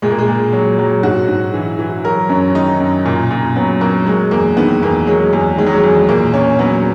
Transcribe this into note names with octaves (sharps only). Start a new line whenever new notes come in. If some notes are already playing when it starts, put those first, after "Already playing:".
A#2 G#3
A#3
G#3
A#2
F#3
F#3
G#2 F#4
G#2
E3
E3
F#3 A#4
F#2 C#4
D#3 D#4
F#2
A#2
A#2
F#3 B3
F#3 A#3
F#3 G#3
E2 A#3
D#3 B3
E2 A#3
F#3 G#3
E2 G#3
D#3 G#3
F#3
G#3
E2
G#3
A#2 A#3
A#2 C#4
F#3 B3